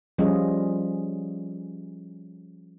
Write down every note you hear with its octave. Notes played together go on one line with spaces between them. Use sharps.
F3 G3 C#4 F4 G#4 D#5